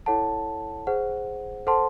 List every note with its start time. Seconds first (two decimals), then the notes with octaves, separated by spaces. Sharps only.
0.06 E4 A4 C#5 F#5 A5
0.87 G#4 C5 F#5
1.67 A4 C5 F#5 A5 C6